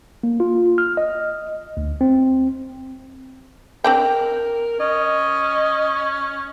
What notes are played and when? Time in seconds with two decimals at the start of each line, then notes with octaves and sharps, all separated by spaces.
0.23 A#3
0.40 F4
0.78 F6
0.97 D#5
1.77 D2
2.01 C4
3.84 C4 D4 A#4 G5
4.80 C#4 D#5